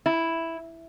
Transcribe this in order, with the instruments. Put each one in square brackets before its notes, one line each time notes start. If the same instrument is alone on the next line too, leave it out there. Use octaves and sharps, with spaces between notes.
[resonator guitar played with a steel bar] E4